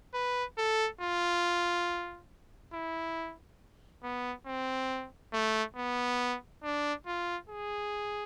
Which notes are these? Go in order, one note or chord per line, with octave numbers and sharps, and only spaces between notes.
B4
A4
F4
E4
B3
C4
A3
B3
D4
F4
G#4